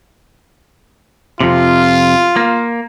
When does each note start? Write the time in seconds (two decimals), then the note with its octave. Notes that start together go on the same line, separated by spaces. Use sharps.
1.41 F2 C3 F4
2.36 A#3